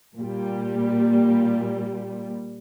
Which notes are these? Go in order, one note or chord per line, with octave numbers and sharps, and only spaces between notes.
A#2 G3